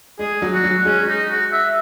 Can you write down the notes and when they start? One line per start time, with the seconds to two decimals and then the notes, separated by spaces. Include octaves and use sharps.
0.19 G#3 G#4
0.42 F#3
0.53 F#4
0.64 F#3
0.85 G#3 C#4
1.08 D#4
1.30 F#4
1.52 E5